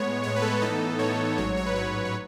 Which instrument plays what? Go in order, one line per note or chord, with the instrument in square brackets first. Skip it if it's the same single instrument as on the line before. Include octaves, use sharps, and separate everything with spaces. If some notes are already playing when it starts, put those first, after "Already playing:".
Already playing: [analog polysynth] A2 G#3 B3 C#5
A2 G#3 B3 C#5
B4
A4
A2 E3 B3 D#4 A4
A2 E3 B3 D#4 C#5
A1 G#2 F#3 C#5
C#5
B4
A1 G#2 F#3 C#5
C#5